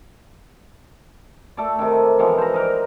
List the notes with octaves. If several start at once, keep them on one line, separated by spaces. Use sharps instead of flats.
A3 A4 D5
C3 D#3
B2 E3 F3 G#3
C5 A#5
D#4 A#4 D5